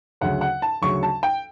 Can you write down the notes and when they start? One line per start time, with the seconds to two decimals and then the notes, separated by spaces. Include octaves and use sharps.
0.21 D2 C#3 F#3 F#5
0.41 F#5
0.62 A5
0.82 D2 C#3 F#3 C#6
1.03 A5
1.23 G5